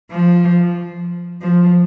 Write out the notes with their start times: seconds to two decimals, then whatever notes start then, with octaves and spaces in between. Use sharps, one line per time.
0.11 F3
1.42 F3